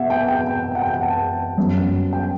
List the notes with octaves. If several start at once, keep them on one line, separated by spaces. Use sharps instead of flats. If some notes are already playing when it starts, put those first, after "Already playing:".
Already playing: B2 E5 F#5
G5
G5
G5
F#5
G5
F#5
A5
G1 F#2 F#3
G5